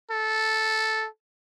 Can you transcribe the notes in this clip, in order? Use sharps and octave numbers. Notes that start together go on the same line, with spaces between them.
A4